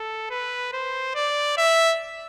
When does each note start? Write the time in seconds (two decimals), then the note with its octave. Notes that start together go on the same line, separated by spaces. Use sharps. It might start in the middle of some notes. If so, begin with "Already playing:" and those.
Already playing: A4
0.30 B4
0.73 C5
1.15 D5
1.57 E5